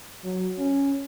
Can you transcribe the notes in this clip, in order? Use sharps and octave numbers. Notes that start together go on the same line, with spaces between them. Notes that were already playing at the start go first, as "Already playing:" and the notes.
F#3
C#4